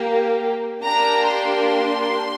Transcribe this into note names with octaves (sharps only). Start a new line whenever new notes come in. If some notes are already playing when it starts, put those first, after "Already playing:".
Already playing: A#3 G4
A#3 D4 G4 A#5
C6